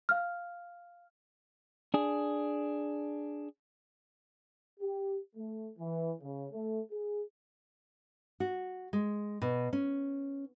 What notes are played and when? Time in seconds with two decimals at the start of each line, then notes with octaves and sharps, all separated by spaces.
0.09 F5 F6
1.94 D4 G#4
4.80 G4
5.36 A3
5.79 E3
6.21 C#3
6.52 A3
6.91 G#4
8.40 F#4
8.93 G#3
9.42 B2
9.73 C#4